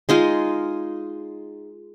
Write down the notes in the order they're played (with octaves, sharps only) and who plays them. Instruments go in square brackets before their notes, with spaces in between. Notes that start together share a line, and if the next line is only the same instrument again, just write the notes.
[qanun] G#3 D#4 F4 G#4